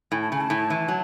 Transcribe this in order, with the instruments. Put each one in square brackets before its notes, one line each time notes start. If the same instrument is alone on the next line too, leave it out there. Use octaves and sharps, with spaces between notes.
[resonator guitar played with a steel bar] A2 [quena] G#5
[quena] A5
[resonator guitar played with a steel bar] C#3 [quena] G#5
[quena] A5
[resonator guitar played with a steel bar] A2
E3
F#3